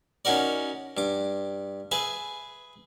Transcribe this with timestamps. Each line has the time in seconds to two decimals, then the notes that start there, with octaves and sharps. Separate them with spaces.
0.25 C#4 D#4 F#4 A#4 D5
0.97 G2 D6
1.91 G#4 B4 E5